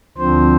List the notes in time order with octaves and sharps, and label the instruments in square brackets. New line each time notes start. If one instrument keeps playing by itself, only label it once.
[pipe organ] D2 D3 F3 C4 C5